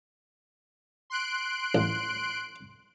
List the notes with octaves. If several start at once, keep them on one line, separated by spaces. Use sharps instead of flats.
C6 F#6 D7
A1